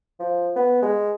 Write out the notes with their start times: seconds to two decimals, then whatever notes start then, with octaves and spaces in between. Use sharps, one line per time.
0.20 F3
0.56 B3
0.82 G#3